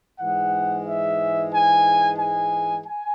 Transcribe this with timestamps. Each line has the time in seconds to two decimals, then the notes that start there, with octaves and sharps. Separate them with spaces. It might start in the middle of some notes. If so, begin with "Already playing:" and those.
0.19 G#2 E3 G#3 F#5
0.86 E5
1.52 G#5
2.19 G#5
2.85 G#5